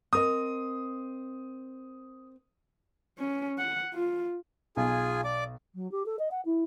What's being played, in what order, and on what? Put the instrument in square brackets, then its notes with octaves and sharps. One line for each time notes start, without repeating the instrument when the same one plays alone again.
[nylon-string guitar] C4 A#4 D#5 [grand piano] D#6
[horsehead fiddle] C#4
F#5
F4
[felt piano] B1 [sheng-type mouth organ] F4 G#4 G#5
[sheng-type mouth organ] D5 D6
[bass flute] F#3
G4
A4
D#5
F#5
E4